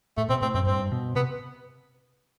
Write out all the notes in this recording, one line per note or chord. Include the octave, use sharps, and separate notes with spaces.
A2 A3
B2 C4
A2 C4
F#2 C4
G2 C4
B2
C3 B3